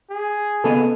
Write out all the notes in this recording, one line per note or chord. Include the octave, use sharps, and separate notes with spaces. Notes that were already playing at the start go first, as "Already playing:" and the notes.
G#4
C#3 B3 A4 D#5